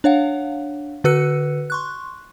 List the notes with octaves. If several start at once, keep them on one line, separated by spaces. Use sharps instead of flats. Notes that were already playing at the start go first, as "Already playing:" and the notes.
D4 C#5 F5 F#5
D3 F#4 B4 E6 F#6 C#7
C6 C#6 F#6